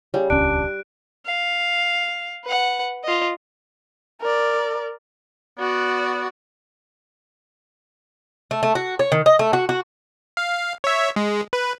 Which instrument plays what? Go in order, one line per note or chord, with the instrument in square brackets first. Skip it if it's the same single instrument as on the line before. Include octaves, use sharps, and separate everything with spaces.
[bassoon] C#3 [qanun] G3
[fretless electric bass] D#1 C#2 C#4 [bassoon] D4 [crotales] F#6 D7
[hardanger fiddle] F5
B4 F#5
F4 D#5
[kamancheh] A#4 D5
[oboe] B3 [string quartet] F#4 D5
[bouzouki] A3
A3
F#4
C#5
D#3
D#5
A3
F#4
F#4
[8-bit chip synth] F5
C#5 E5
G#3
B4